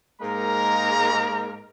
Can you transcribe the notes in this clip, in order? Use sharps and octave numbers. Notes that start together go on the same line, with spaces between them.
G#2 G#3 A#3 D#4 A#4 A#5